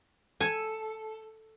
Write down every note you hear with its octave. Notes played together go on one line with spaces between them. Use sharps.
A4 G#5